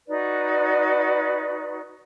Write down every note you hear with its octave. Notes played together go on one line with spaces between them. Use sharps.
D#4 F#4 B4 D5